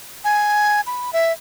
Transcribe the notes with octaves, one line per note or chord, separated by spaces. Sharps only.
G#5
B5
E5